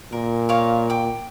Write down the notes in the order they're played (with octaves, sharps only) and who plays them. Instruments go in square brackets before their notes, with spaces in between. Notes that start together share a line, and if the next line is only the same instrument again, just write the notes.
[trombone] A#2 [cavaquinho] A#4
[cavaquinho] A#4 C#5 F5
G5 D6